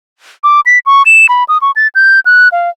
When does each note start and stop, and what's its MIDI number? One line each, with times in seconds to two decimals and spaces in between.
0.44 0.60 86
0.66 0.79 95
0.86 1.03 85
1.06 1.27 100
1.29 1.44 83
1.49 1.58 87
1.62 1.71 85
1.76 1.88 93
1.95 2.20 91
2.26 2.48 90
2.52 2.70 77